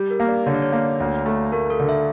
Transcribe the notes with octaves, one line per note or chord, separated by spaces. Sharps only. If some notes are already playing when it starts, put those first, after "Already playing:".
Already playing: G3
A#4
A#3
D5
D3 C#5
D5
C#5
A#3
D2
A3
A3 A#4
A4
D3
E5